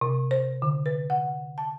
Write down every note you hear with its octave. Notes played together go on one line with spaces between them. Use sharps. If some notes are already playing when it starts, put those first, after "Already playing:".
C3
C5
D3
B4
F#5
A5